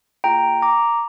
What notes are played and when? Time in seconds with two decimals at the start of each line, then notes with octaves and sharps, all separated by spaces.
0.24 A#3 F4 G#4 G5 A#5
0.62 A#5 D6